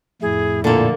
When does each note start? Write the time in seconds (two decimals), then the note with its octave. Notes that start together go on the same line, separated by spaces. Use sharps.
0.22 F2 A2 E4 G#4
0.64 A#2 D3 A#3 A4